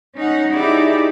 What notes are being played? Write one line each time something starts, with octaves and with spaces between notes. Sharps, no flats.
C#4 D#4 F#5
D#4 E4 G4 G#4 D5 E5